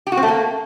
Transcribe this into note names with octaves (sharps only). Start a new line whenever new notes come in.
G4
F#4
C4
A3
A#3